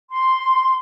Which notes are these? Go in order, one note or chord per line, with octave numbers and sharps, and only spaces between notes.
C6